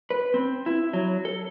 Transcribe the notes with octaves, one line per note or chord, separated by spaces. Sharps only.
B4
C4
E4
F#3
A4